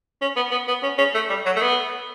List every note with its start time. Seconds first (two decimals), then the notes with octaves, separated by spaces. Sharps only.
0.22 C#4
0.36 B3
0.52 B3
0.68 B3
0.83 C#4
0.98 C#4
1.14 A3
1.29 G3
1.46 F#3
1.56 A3
1.62 B3